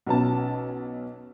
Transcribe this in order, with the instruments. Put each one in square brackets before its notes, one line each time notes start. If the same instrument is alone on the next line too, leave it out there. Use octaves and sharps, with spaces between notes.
[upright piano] B1 B2 C#4 A5